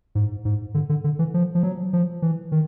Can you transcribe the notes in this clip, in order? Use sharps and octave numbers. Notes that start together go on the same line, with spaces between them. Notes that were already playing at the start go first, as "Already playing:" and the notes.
G#2
G#2
D3
D3
D3
E3
F3
F3
F#3
F3
E3
D#3